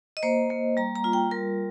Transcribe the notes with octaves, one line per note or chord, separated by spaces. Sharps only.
D#5
A#3 C5
A#3
G3 A#5
A#5
F4
G5
G3 A#4